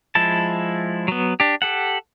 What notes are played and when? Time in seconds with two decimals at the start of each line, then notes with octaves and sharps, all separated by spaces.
0.15 F3 G#3 E4 A5
1.08 F#3 B3
1.40 D4 G4
1.62 G4 A4 F#5